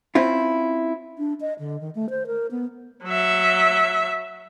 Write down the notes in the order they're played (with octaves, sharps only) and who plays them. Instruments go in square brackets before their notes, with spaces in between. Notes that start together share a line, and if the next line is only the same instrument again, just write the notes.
[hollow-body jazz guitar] C4 C#4 E4 F4
[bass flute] D4
D#5
D3
D#3
A3
C5
A#4
B3
[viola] F#3 E5